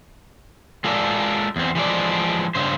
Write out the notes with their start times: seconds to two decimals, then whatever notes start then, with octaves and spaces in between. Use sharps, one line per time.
0.84 G#3 F4 A4 A#4 D5
1.56 E2 C4
1.75 E3 F3 G#3 D5
2.55 G2 C#3 C5